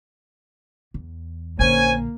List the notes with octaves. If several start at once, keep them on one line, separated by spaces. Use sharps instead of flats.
E2
A#1 D3 A#3 C#4 C5 G#5